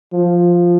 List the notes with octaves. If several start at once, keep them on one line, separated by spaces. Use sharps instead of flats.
F3